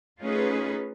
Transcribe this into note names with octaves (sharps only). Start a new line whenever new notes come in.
A3 C#4 D#4 F4 G#4 B4